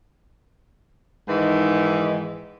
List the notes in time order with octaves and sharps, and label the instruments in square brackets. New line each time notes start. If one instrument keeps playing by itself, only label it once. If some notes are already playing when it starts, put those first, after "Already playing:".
[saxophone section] G#2 D#3 E3